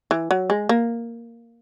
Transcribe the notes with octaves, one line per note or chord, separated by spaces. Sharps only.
E3
F#3
G#3
A#3